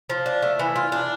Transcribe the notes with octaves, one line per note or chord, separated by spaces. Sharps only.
F3
D4
A3
E3
F4
D4